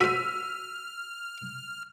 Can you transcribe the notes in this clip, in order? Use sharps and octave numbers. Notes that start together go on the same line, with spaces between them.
F#4 C5 E6 F6 B6 D#7